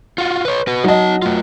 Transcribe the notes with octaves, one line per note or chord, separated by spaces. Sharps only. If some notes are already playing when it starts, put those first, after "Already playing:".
F4 F#4
B4 C#5
F#4 B4
F#3 D#4 D#5 A5
A3 F4